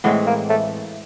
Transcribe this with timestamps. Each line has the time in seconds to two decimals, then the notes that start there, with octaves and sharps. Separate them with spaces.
0.04 A2 E3 G#3 B3 C4
0.27 A#3
0.49 A3